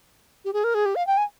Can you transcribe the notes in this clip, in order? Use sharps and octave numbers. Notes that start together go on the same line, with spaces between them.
G4
G#4
A#4
G#4
G4
F5
G5
G#5